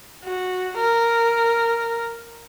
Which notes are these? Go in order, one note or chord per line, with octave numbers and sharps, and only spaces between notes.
F#4
A#4